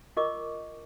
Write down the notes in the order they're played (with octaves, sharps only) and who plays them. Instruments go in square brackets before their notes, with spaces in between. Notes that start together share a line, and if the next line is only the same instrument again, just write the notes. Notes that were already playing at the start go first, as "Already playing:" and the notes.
[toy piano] F4 A#4 D#5 C#6 D6